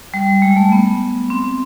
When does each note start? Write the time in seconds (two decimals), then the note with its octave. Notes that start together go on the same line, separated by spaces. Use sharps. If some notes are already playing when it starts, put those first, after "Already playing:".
0.14 G3
0.42 G#3
0.57 A3
0.72 B3
1.30 C4